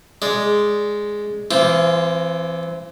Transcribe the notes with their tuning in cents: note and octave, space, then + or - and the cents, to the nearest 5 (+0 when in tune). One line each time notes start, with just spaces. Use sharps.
G#3 +0 D5 +0
E3 +25 C4 +0 F4 -20